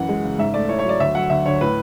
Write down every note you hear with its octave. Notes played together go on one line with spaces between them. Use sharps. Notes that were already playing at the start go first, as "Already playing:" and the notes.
Already playing: F#2 E3 F#5
G#3
C#3
G#2 E5
A3 D5
E4 C#5
C#5
F#3
D5
D2 E5
F#3 F#5
D2 E5
D3 C#5
A2 B4